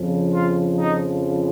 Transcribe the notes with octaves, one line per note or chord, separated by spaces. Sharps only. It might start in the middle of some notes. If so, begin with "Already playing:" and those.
Already playing: F2 C#3 F3
F4
D#4